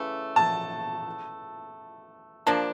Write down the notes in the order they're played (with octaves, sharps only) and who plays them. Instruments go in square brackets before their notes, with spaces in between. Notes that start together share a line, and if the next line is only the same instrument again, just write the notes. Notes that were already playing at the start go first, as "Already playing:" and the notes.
Already playing: [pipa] C#3 E3 A3
[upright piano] A5
[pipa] F3 A#3 D4 [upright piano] A5